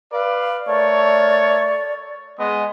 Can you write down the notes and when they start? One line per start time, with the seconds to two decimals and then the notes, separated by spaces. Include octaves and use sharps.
0.12 B4 D5 F5
0.67 A3 A#4 C#5 D5
2.38 G#3 B3 D#5